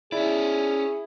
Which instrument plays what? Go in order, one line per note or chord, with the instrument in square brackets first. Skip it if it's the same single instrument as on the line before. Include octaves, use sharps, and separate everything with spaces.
[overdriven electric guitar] C#4 D5 [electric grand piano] E4 [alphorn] G#4